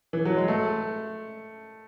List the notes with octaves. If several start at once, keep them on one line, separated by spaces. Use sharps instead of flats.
E3
F#3
G#3
A3